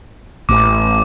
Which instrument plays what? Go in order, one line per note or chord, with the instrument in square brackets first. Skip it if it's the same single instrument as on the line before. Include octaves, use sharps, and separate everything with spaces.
[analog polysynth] A1 [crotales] D6